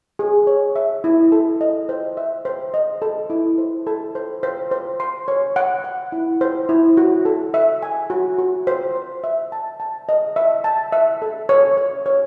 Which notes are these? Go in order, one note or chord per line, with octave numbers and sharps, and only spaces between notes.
G#4
C#5
E5
E4
A4
D#5
C5
E5
C5
D#5
A4
E4
C5
A4
C5
C5
C5
C6
C#5
F#5
F#5
E4
C5
E4
F#4
A4
E5
G#5
F#4
F#4
C5
C5
E5
A5
A5
D#5
E5
A5
E5
A4
C#5
C#5
C#5